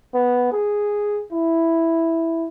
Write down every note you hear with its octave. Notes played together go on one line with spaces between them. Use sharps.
B3
G#4
E4